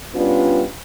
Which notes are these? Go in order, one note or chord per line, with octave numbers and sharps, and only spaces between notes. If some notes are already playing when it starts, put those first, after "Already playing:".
G3 B3 C#4 D4 F4